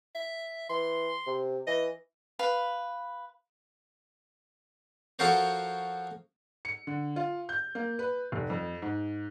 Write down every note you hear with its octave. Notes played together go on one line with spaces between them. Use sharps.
E5
E3 C6
C3
E3 D#5
B4 F5 B5
F3 F#4 A4 A#4 C5 C#5
C#7
D3
F4
G6
A#3
B4
F1
F2
G#2